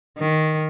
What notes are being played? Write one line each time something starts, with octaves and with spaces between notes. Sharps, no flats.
D#3